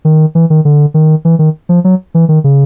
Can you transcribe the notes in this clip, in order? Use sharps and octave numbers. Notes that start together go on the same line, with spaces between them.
D#3
E3
D#3
D3
D#3
E3
D#3
F3
F#3
E3
D#3
C#3